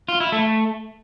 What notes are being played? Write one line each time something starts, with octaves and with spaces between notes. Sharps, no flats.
F4
E4
A3